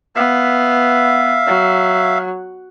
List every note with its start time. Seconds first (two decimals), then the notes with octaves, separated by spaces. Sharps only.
0.16 B3 E5 F5
1.46 F#3